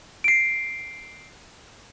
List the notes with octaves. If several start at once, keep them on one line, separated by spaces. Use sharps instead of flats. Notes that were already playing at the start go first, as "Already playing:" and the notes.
C7 D7